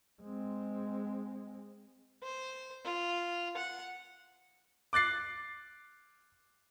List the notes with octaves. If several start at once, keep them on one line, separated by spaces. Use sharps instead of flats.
G#3 C4
C5
F4
F#5
D6 F#6 A6 C7